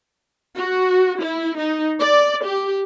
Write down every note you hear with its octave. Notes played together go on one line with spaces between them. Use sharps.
F#4
E4
D#4
D5
G4